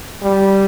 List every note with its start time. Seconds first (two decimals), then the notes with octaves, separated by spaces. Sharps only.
0.22 G3